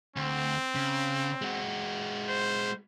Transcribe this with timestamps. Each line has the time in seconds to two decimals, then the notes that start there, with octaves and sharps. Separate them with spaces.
0.16 D2 C4
0.75 C#3
1.42 G#3 F#4
2.29 C5